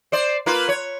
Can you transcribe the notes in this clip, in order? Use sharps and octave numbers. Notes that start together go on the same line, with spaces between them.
C5 D5
A#3 F4 B4
C#5